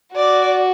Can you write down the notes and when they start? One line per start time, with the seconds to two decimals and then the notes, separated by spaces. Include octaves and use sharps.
0.15 F#4 D5